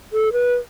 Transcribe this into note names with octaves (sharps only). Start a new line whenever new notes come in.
A4
B4